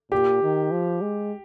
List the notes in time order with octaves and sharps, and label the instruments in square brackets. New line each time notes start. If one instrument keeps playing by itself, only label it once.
[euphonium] A#2 [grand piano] G4
[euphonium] D#3
F3
G#3